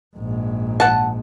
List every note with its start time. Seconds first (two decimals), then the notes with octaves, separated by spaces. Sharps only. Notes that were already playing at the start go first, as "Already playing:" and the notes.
0.17 A#1 G#2
0.80 F#5 A5